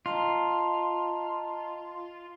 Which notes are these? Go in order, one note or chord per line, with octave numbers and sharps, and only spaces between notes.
F4 D#5 A5 A#5